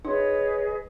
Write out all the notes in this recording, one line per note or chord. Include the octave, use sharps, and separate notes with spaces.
D#4 G#4 B4 C#5 D#5